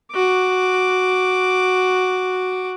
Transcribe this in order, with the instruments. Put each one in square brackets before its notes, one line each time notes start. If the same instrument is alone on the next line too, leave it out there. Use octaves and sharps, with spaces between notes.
[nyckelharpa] F#4 D6